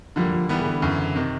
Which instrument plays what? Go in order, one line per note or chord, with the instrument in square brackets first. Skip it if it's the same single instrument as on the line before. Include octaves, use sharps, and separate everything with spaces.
[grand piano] D3 G3 A#3 [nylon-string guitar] F3
[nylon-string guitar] F#3
F3
[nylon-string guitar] D#3 [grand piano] E3 G3 B3
[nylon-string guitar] C#3
D3
[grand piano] F#2 C#3 E3
C3 D#3